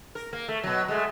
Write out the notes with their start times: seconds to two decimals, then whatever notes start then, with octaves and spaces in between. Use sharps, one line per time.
0.15 A#4
0.33 A#3
0.48 A3
0.63 B2 F#3
0.88 G#3 A3